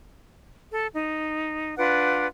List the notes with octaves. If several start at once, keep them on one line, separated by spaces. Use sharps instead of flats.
A4
D#4
D4 F4 B4 F#5